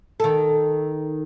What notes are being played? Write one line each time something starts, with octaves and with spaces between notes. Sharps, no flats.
D#3 A4